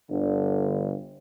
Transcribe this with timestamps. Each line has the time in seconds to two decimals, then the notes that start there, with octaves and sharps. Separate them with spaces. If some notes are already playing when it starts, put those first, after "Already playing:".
0.11 G1 D3